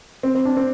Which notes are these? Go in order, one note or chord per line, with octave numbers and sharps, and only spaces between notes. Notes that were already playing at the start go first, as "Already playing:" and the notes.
C4
C4
D4
C4